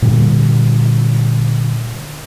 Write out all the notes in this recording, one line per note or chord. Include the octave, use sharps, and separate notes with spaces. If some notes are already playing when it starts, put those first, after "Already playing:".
A#2 D3 G3